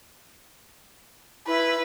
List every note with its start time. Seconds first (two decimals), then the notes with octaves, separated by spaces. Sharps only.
1.47 E4 B4